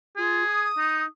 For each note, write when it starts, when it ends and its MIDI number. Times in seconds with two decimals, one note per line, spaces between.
0.17 0.45 65
0.17 0.67 68
0.46 1.02 87
0.78 1.04 63